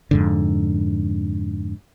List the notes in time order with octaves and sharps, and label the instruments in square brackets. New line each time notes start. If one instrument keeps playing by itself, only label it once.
[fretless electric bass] F2 G#2 D3